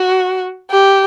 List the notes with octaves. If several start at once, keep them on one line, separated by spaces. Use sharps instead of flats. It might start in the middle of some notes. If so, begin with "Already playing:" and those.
Already playing: F#4
G4